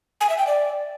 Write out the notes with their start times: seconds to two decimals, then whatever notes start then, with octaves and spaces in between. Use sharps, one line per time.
0.21 G#5
0.29 E5
0.38 G5
0.47 D5